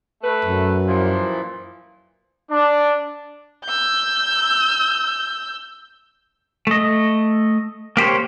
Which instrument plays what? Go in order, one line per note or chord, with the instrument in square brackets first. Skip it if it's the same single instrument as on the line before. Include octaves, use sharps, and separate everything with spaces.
[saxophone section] A3 B4
[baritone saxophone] F#2
[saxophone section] A#2 E3 F3
[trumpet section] D4
[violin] E6 G6
[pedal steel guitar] A3 D#5
A#3 G4 C5 C#5